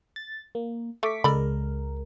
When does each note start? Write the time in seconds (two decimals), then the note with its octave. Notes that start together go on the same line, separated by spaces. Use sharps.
0.16 A6
0.55 A#3
1.03 A3 C#6 D6 B6
1.24 C#2 G#3 A4 A#4 D5 B5